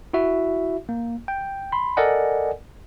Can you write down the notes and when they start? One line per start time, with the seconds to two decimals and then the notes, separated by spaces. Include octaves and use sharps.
0.13 E4 F#4 E5
0.89 A#3
1.28 G5
1.72 B5 C6
1.97 A4 A#4 D5 D#5 F#5 G#5